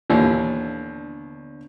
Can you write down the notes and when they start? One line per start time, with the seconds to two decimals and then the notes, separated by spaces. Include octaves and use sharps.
0.10 D#2 A#2 D3 E3 B3 D4